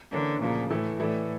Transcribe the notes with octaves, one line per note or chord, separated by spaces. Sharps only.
D3 E3 A#3 C#4
D2 A#2 C#3 F3 A#3
A2 E3 A3 E4
A2 E3 A3 E4 A4 D5